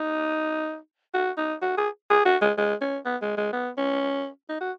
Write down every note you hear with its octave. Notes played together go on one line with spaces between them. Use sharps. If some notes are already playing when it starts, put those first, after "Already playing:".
Already playing: D#4
F#4
D#4
F#4
G#4
G#4
F#4
G#3
G#3
C#4
B3
G#3
G#3
B3
C#4
D#4
F#4